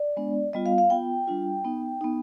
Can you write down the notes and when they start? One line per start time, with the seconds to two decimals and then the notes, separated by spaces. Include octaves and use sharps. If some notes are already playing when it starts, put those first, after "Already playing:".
Already playing: D5
0.17 G#3 B3 D4
0.53 G3 B3 F4 D#5
0.66 F5
0.78 F5
0.90 B3 F4 G5
1.27 G3 D4 F4
1.65 B3 D#4
2.01 B3 D#4